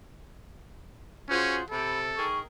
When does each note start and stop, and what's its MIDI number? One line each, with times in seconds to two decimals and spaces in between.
1.29 1.59 61
1.29 1.63 65
1.29 1.58 66
1.29 1.58 68
1.29 1.58 72
1.70 2.11 48
1.70 2.26 69
1.70 1.98 83
2.16 2.39 51
2.16 2.39 68
2.16 2.39 70
2.16 2.39 85